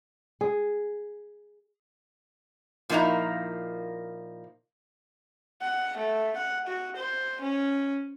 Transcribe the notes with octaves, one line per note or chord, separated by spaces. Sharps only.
G#4
A#2 F3 A#3 D#4 E4 A#5
F#5
A3
F#5
F#4
C5
C#4